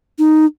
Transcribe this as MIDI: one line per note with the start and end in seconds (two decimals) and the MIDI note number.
0.18 0.45 63